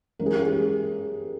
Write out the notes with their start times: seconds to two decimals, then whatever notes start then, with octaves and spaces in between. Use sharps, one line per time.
0.19 E3 G#3 C#4 A#4
0.26 G#4
0.34 G4
0.40 G#4